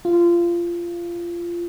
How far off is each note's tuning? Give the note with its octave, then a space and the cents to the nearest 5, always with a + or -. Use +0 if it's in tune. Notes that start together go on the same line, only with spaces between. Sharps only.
F4 -20